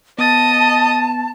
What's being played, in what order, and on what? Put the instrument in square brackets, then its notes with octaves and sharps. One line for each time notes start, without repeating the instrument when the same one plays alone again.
[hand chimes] B3 A6 [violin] D#5 D#6 [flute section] A5